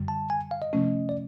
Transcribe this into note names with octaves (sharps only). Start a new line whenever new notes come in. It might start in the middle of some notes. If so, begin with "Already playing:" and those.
Already playing: F#2 D3 G3
A5
G#5
F5
D#5
C3 F3 A3 C#4
D5